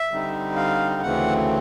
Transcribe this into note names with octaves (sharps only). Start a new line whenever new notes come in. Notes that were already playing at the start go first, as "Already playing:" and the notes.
Already playing: E5
D3 G3 C4 D#4
F5
D2 C#3 E3 A3 C4 F#5